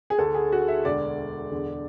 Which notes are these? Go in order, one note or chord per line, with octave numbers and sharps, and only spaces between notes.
G#4
D2 D3 A4
G#4
F#4
E5
E1 D2 D3 D5
E1 E2 D3